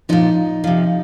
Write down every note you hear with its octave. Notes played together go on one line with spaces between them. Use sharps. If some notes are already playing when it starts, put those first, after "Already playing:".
A#2 F3 D#4
C3 F3